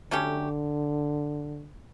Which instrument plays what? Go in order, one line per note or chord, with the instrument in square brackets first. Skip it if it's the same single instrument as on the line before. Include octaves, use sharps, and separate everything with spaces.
[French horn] D3 [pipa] F#3 A3 C#4 G4